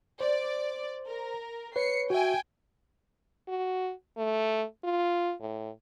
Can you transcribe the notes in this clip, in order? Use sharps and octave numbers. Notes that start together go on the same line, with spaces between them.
C5 D5
A#4
B4 C#5 C7 C#7
F#4 E5 G5 G#5
F#4
A3
F4
A2